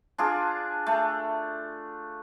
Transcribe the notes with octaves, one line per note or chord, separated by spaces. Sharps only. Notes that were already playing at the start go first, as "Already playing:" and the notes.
D4 F4 G#4
A3